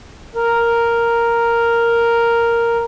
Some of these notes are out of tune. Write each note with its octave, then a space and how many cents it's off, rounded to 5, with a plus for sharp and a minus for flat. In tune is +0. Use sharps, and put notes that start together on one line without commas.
A#4 +0